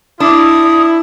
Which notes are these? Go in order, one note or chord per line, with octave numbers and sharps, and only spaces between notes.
D4 E4 D#6